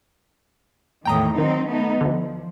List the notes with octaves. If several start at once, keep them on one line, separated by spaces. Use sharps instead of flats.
E2 A2 D#3 G5 A#5 D#6
D#3 F#3 C4 D#4
A3 B3 D#4
D2 D3 F3